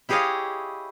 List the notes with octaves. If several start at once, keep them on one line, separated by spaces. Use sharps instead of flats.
E4 G4 G#4 C#5 D#5 F5